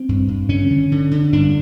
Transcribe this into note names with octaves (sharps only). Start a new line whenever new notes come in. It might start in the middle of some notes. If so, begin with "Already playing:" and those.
Already playing: C4
G2
G2
D3 C#4
D3
D3
D3
G2 D4